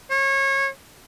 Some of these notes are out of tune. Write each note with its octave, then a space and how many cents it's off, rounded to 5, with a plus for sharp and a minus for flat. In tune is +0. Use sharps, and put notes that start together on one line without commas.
C#5 -30